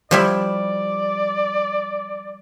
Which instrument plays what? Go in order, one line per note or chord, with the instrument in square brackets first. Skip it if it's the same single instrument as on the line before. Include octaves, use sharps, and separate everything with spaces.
[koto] F3 G3 E4 [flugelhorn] D5